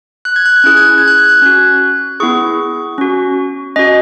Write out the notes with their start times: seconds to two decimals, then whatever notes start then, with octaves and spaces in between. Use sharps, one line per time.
0.25 F#6
0.36 G#6
0.46 F#6
0.56 G#6
0.64 C#4 E4 G#4 F#6
0.77 G#6
0.88 F#6
0.98 G#6
1.08 F#6
1.19 G#6
1.29 F#6
1.42 C#4 F#4
2.20 B3 E4 G#4 C#6
2.98 C#4 F#4
3.76 C#4 F#4 D#5